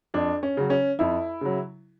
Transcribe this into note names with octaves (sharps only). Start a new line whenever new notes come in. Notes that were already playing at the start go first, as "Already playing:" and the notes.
F2 D4
C#4
C#3 F#3
C#4
F2 E4
C#3 F#3